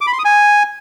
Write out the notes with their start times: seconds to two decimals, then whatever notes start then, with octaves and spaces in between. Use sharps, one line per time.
0.01 D6
0.07 B5
0.13 C6
0.19 D#6
0.25 G#5